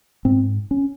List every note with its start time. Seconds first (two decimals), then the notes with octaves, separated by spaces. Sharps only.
0.25 G#2 C4
0.71 C#4